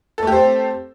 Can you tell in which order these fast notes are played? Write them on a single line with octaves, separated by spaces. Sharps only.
A4 A3 G4 C5 C4